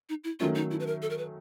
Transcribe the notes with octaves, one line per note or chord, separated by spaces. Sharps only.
D#4
E4
D#3 F#3 A3 C#4 F4
D#4
E4
B4
A#4
A4
A#4
B4